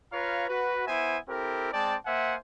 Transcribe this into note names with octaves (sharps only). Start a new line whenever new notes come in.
F4 B4 C#5 F5 A#5
F#4 B4
B3 E4 C5 E5 G#5
C4 E4 G4 A4 A#4
G#3 C4 D5 G5 A5
A#3 C5 E5 F#5 G#5